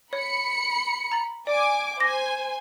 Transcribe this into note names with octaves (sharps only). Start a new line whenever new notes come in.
C#5 B5 C#7
A#5 A6 F#7
D5 G#5 D6
C5 G#5 D6 A#6